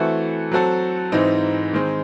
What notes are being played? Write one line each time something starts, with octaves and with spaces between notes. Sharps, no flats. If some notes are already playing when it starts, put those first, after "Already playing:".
Already playing: E3 A3 C4 F#4 A4
F#3 C4 F#4 A4
G#2 E3 C4 D#4
D#3 G#3 C4